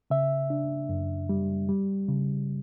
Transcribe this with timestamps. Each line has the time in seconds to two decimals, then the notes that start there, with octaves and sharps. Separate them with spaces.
0.10 C#3 E5
0.50 D4
0.89 F#2
1.29 G3
1.69 G3
2.08 C#3